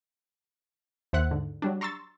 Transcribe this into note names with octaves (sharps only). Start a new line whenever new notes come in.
D#2 C5 E5 F#5 F#6
G#2 D3
F#3 G3 D4
A#5 C6 C#6 E6 A6